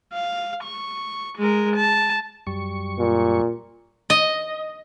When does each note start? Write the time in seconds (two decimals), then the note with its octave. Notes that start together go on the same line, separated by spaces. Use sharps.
0.13 F5
0.63 C#6
1.38 G#3 A#4
1.75 A5
2.47 F#2 G3 C#6
2.99 A#2
4.10 D#5